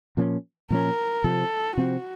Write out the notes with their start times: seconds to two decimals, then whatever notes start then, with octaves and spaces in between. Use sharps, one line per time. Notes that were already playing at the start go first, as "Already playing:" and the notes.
0.17 A#2 F3 A#3 C#4
0.70 A#2 F3 A#3 C#4 A#4
1.24 C3 F3 C4 A4
1.77 C3 F3 C4 F#4